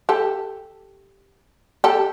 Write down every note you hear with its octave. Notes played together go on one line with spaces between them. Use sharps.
G4 A4
G4 A4